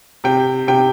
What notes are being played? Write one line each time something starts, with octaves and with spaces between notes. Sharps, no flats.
C3 G5
C3 G5